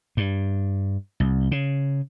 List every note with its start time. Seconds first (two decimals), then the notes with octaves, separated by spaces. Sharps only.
0.17 G2
1.20 C2
1.51 C#3